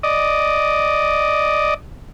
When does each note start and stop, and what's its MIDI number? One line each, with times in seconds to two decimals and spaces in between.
0.03 1.74 74
0.03 1.74 75